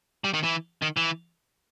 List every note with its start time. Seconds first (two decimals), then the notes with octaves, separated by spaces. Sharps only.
0.24 G3
0.34 D#3
0.43 E3
0.82 D#3
0.97 E3